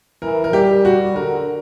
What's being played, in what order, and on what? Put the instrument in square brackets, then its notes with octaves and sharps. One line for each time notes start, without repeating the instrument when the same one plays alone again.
[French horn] E3 [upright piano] A#4
[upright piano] A#4
[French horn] G3 [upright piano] G4
[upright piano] F#4
[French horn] D3 [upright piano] A#4